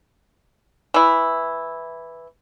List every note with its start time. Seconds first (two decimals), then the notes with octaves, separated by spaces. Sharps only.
0.94 E3 E4